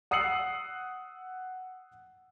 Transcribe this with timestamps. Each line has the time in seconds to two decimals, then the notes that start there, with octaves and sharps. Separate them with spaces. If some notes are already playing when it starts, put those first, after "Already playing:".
0.11 F#5 D#6 E6 C7 C#7 F#7